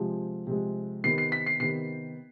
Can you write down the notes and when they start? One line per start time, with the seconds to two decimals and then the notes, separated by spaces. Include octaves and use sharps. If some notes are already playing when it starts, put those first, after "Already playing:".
Already playing: C3 F3 G#3
0.47 C3 F3 G#3
1.04 C3 D#3 B3 C7
1.18 C7
1.32 B6
1.46 C7
1.60 C3 D#3 B3 C7